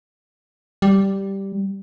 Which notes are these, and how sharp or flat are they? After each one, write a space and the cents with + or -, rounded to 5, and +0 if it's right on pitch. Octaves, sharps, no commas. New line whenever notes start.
G3 -5